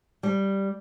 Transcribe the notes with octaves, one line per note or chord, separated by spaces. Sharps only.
G3